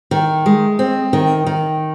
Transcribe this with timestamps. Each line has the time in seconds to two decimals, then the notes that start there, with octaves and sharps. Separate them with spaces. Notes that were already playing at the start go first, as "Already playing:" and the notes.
0.11 D#3
0.46 G#3
0.79 C4
1.13 D#3
1.46 D#3